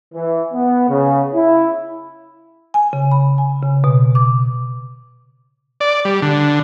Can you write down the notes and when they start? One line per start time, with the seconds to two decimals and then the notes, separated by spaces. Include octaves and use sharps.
0.14 E3
0.54 B3
0.89 C#3
1.34 E4
2.74 G#5
2.93 C#3
3.11 B5
3.38 G#5
3.63 C#3
3.84 B2
4.15 D6
5.81 D5
6.05 G3
6.22 D3